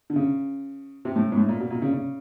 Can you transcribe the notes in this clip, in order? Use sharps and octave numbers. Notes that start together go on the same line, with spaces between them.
D3
C#3
C3
A2
G#2
A2
A#2
B2
A#2
C#3
C#3